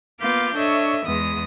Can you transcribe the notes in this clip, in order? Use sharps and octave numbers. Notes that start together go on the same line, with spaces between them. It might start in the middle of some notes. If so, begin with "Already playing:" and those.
A#3 B3 F4 F5 D6 G6
D4 A4 C#5 D#5 E5
E2 G#3 B3 D#6